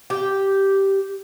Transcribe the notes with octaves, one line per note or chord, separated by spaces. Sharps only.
G4